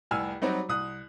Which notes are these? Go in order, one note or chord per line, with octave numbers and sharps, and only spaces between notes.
F1 C2 G#5 E6 F6
F#3 G3 C4 D#4 F#4
C2 D#6 F#6